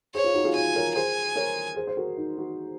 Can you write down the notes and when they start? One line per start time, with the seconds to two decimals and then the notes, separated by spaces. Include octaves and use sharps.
0.14 G#4 C5 C#5
0.24 F4
0.34 D#4 F#4
0.44 F4 G#4
0.55 F4 G#5
0.75 A#4 C#5
0.95 G#4 C5 G#5
1.36 A#4 C#5
1.76 G#4 C5
1.87 C5
1.97 F#4 A#4
2.17 D#4
2.37 D#4 F#4